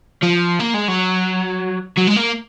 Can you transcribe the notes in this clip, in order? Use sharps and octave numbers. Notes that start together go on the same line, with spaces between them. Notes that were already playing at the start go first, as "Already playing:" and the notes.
F3
A#3
G#3
F#3
F#3
G#3
A#3